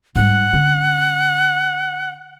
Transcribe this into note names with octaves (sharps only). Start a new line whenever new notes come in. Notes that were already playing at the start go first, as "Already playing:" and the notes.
G#2 G3 F#5
D3 C#4